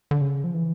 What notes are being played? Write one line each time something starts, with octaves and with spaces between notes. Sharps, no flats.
D3
C#3
F3
E3